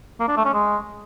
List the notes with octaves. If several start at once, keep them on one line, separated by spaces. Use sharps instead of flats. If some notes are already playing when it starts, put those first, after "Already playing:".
A#3
D4
A3
C#4
G#3